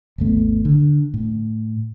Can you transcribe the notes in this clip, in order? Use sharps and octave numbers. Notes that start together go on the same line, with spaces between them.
G#1 D#2 A3 B3
D3
A2